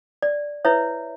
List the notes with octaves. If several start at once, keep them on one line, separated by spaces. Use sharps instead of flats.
D5
E4 B4 C#5 E5